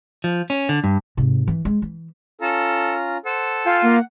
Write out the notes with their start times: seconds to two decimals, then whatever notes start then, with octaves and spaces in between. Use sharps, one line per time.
0.24 F3
0.50 C#4
0.69 D3
0.84 G2
1.17 G#2 C3
1.47 E3
1.65 G#3
1.82 E3
2.41 C#4 F4 A4 A#5
3.25 A4 C5 F#5
3.65 F4 F5 G5 G#5
3.82 A#3 F#5